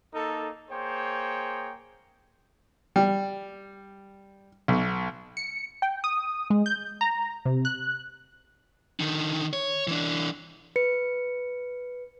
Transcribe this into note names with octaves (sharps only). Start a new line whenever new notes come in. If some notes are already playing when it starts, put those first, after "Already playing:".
A#3 D#4 A4
A#3 G#4 C5 C#5 G5
G3
B1
C#7
G5
D#6
G#3
G6
A#5
C3
F#6
D3 D#3
C#5
E3 D4
B4 C#7